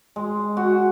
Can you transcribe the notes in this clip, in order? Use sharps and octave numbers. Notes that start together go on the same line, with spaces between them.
G#3
F#4